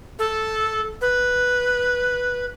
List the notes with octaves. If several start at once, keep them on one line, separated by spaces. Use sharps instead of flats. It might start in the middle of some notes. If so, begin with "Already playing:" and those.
A4
B4